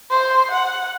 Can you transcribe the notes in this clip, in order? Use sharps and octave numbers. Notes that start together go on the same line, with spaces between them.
C5
F#5